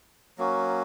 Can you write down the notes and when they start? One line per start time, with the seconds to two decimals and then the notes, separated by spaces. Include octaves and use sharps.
0.38 F#3 A#3 C#4 F#4